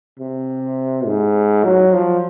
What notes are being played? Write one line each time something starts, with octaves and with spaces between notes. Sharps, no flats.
C3
G#2
F#3
F3